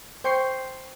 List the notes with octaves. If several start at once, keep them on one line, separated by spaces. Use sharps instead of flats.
C5 G5 C6 C#6 G6 C7